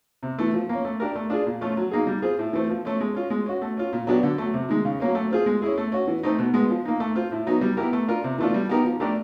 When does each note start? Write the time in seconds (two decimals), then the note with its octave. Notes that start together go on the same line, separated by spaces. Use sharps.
0.23 C3
0.39 E3 A3
0.54 F3
0.69 A#3 C#4
0.85 A3
1.00 D4 G4 A#4
1.16 A3
1.30 D4 F4 G#4
1.46 A#2
1.61 F3 A3 C#4 F4
1.77 F#3
1.91 A#3 D#4 G#4
2.07 G3
2.22 C4 F4 G#4
2.39 A2
2.53 E3 A3 C4
2.69 F3
2.85 A3 C#4
3.00 G#3
3.15 C#4 F4
3.30 G#3
3.46 C#4 F#4
3.62 A3
3.77 C#4 F4
3.93 A#2
4.07 F#3 B3 D4 G4
4.23 D3
4.38 F#3 A3
4.54 C3
4.69 D#3 G#3
4.85 C#3
5.00 F#3 A#3 C#4
5.15 A3
5.31 C4 F4 G#4
5.46 G#3
5.62 C#4 E4 G#4
5.78 A3
5.92 C#4 F#4
6.07 E3
6.23 A3 C4 D#4
6.39 B2
6.54 G#3 B3
6.70 F3
6.85 A#3 D#4
7.00 A3
7.15 C4 F4
7.32 A2
7.47 F#3 B3 D#4
7.61 G3
7.77 B3 E4 G4 A#4
7.93 A3
8.08 D4 F4 A#4
8.24 C3
8.38 E3 A3 D4 F4
8.54 G3
8.69 B3 D#4 G4 A#4
8.85 F3
9.00 A3 D4 G4 A#4